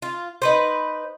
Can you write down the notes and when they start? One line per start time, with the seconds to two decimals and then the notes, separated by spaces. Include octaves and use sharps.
0.02 F4
0.42 D#4 B4 C5